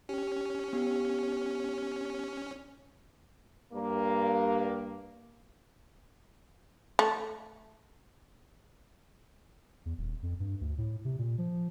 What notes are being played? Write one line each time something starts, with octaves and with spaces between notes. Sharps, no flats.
C#4 G4
B3 G4
G2 A#3
A3
E2
D#1
F2
G2
D2
A2
C3
A#2
F3